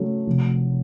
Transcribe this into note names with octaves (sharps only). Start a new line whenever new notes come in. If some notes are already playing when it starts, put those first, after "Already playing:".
Already playing: C#3 F#3 A3
F1